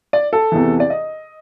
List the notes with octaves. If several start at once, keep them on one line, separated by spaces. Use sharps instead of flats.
D5
A4
E2 C3 E3
D5
D#5